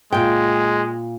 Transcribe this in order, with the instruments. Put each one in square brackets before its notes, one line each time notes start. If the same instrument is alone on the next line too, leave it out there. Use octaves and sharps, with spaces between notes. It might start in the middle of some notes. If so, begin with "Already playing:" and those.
[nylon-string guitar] A#2 G5 [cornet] G#3